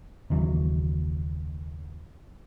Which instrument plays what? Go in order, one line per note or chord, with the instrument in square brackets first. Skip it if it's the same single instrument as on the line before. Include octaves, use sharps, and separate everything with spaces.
[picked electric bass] F#1 D#2 E3 F#3